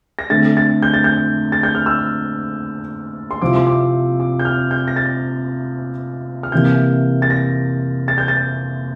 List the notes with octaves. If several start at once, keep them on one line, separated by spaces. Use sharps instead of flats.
A#6
D3 A3 C4 A6
A6
G6
A6
G6
A6
G6
F6
E6
C6
C3 F3 C4 E4 D6
C6
D6
D6
G6
F6
G6
A#6
A6
F6
C3 E3 A#3 G6
A6
A#6
A6
G6
A6